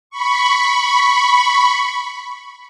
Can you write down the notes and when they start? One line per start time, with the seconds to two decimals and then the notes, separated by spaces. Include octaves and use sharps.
0.10 B5 C#6